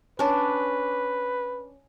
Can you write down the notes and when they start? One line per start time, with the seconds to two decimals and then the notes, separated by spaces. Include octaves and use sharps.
0.19 C#4 D4 B4